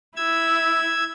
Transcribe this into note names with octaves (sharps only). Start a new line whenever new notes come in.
E4 E6 G#6